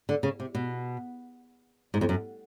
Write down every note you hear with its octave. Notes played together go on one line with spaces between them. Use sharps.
D3
C#3
C3
B2
G#2
F2
F#2